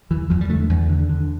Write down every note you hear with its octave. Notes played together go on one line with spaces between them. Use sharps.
E2 E3
E2 F3
G3
D3 A3
E2
D3
D3